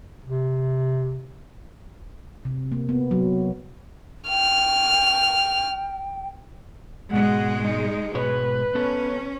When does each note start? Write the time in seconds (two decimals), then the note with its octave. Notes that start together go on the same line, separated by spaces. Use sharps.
0.24 C3
2.45 C3
2.72 A#3
2.89 B3
3.11 F#3
4.29 G5 F6
7.13 G#2 B2 G#3 F#5
7.62 D#4
8.14 G#2 B2 B4 C#5
8.75 B3 C#4 A4